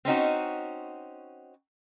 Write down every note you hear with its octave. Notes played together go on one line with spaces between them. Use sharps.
C4 C#4 D#4 F#4